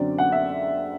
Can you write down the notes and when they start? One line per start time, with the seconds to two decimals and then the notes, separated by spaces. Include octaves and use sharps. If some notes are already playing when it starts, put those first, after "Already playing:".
Already playing: F#2 D3 F#3 C4 D5
0.18 F#5
0.32 E5